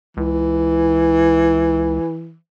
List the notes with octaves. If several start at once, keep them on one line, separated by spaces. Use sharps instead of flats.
C#2 E3